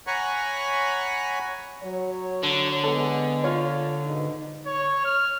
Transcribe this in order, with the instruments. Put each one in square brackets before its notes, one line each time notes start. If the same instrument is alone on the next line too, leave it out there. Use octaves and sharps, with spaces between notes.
[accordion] C#5 F#5 G#5 A#5 B5 C#6
[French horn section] F#3 C#5
[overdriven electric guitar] D3
[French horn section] G#3 B3 [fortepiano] A4
[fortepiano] F4 C#5
[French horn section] G#2 B2 D#4
[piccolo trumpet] C#5
F6